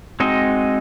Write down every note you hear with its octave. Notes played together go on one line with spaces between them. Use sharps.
G#3 C4 D#4 F#4 D#5